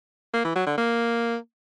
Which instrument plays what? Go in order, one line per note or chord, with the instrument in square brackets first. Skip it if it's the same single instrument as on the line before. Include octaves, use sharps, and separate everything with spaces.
[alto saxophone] A#3
E3
F#3
D3
A#3